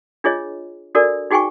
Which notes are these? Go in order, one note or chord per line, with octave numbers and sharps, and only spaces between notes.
D4 F4 G#4 C#5 D#5
D4 F#4 A4 A#4 D5
D#4 F#4 G#4 G5 G#5 C#6